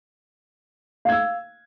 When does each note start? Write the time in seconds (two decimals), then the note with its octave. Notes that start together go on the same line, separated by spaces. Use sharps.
1.05 F5
1.09 G#6
1.12 E6